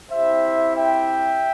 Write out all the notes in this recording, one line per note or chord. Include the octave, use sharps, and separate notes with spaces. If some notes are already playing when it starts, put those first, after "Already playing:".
C4 E4 G4 C5 E5
E5 G5